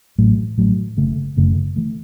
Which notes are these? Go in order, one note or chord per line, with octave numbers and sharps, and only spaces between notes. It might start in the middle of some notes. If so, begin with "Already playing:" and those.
A1 A2 F#3 A3
A1 A2 F#3 A3
F#1 F#2 C#3 A3
F#1 F#2 C#3 A3
E3 A3